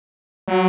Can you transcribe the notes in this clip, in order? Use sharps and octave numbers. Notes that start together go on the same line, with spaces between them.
F#3